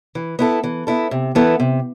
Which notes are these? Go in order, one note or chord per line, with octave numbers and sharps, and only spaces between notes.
E3
B3 E4 A4
E3
B3 E4 A4
C3
E3 B3 E4 A4
C3